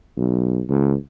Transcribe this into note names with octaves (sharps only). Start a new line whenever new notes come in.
B1
C#2